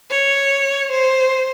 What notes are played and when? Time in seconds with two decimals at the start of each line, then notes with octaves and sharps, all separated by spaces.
0.10 C#5
0.91 C5